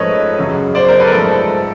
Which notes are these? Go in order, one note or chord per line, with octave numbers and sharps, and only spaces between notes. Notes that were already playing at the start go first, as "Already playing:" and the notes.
Already playing: G#2 F3 A3 C#4 A4 B4 C#5 D#5
F#2 C#3 F#3
C5 D5
A#4 C5
A4 B4
A#4
G#2 F3 A3 A4
A4